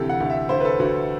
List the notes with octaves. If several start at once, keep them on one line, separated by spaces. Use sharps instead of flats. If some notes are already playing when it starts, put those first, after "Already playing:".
Already playing: D2 C3 E3 G4 A4
F#5
D2
E5
D2 C5
B4
A4
D2 F#4